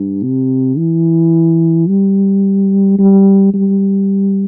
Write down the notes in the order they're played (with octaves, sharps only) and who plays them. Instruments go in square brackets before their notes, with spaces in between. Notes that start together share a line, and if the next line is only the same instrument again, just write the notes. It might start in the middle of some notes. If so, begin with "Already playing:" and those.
Already playing: [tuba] G2
C3
E3
G3
G3
G3